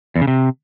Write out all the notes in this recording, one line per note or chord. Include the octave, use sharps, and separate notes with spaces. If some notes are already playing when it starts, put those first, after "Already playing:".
E2
C#3
C3